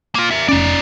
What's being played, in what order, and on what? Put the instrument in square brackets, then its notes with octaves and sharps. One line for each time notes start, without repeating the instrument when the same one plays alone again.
[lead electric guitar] A#3 F4
A#4 E5
[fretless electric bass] F1 C#4 [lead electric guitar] D#4 D5